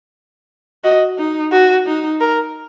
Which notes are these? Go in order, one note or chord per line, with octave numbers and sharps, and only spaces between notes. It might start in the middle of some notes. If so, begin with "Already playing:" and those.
F#4 D#5
D#4
F#4
D#4
A#4